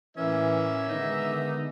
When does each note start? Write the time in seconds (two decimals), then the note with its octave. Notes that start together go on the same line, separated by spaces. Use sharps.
0.17 A2 E3 A#3 C#4 E5
0.89 D3 D#3 G#3 B3 D#4